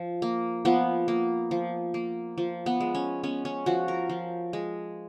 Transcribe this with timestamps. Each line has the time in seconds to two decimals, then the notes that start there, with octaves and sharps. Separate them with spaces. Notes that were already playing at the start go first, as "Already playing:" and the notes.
Already playing: F3
0.22 A#3
0.65 F3 B3
1.08 A#3
1.51 F3
1.94 A#3
2.38 F3
2.66 B3
2.80 G#3
2.95 C#4
3.24 B3 C#4
3.45 C#4
3.66 F3 F#4
3.88 A#4
4.10 F3
4.53 G#3